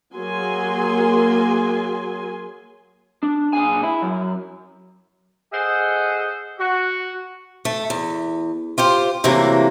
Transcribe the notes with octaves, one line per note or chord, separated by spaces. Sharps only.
F#3 A#3 G#4 G#5 C6
D4
A#2 G#4 G#5
E4
F#2
G#4 A4 C5 D#5 F#5
F#4
A3
E2
F4 G4 C5
C3 E3 F#3 A3 A#3